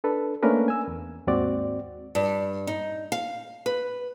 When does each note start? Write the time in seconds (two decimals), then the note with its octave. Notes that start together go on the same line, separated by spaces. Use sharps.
0.04 D4 A4 B4
0.42 A3 A#3 C#4 D4 A#4 B4
0.68 G#5 E6
0.88 E2
1.27 D#2 G#2 C4 F#4 D5
2.15 G2
2.67 D#4
3.12 F5
3.66 B4